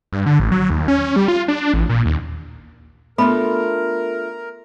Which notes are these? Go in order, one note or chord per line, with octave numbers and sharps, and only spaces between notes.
G2
D3
A1
F#3
D#2
C#4
G3
F4
D4
A1
A#2
D#2
A3 B3 D4 F4 A4 A#4 B5